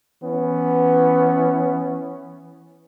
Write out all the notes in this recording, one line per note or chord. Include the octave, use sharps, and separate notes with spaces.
E3 B3 C#4